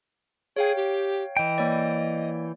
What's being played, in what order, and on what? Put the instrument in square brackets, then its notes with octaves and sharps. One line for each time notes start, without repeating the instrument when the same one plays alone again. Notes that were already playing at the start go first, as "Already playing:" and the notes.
[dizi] G#4 [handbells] C#5 F5 G5
[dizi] G4
[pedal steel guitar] E3 G5 [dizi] D#5
[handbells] A#3 C#5 D5